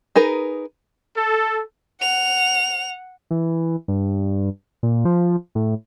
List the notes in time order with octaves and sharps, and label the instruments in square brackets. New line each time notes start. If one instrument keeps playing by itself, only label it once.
[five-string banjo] D#4 G#4 A#4 B4
[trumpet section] A4
[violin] F#5 F7
[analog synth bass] E3
G2
A#2
F3
A2